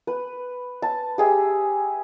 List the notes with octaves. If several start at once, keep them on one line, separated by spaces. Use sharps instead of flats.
B4
A5
G4 G#4 E5